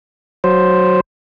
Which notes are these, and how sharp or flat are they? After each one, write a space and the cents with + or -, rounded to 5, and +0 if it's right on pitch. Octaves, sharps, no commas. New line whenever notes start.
F#3 +0 C5 +0